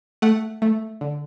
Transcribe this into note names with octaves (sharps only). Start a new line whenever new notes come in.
A3 F#5
A3
D3